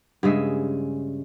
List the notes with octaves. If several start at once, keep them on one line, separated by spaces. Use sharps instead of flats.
G2 C#3 G#3 E5